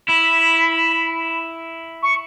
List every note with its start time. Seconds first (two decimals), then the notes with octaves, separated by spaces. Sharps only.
0.08 E4 B5
2.03 C#6